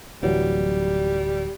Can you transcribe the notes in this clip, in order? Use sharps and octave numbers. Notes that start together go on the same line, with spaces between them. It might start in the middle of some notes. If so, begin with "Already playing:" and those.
D1 E3 F#3 G3